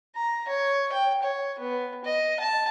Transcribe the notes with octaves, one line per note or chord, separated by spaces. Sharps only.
A#5
C#5
G5
C#5
B3
D#5
A5